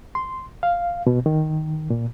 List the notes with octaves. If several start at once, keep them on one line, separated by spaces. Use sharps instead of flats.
C6
F5
B2
D#3
A#2